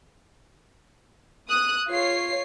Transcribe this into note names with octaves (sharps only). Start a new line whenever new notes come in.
D#6 F#6
F4 C#5 C7